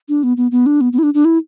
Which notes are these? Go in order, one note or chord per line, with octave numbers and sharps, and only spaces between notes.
D4
B3
B3
B3
D4
B3
B3
E4
D4
D4
E4